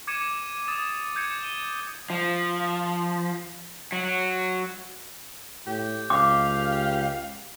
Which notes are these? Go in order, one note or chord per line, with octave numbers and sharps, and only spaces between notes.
D6 G#6 C#7 D#7 E7
D#6 A6 E7
D6 G6 G#6 C#7
D#7 G7
F3
F#3
A2 G4
C#2 F5 D6